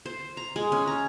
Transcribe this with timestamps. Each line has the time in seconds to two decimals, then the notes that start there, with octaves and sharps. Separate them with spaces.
0.06 C5
0.37 A#5
0.56 G#3
0.72 C#4
0.87 A#5